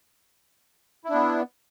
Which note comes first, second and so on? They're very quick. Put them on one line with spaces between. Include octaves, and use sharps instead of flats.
E4 D4 B3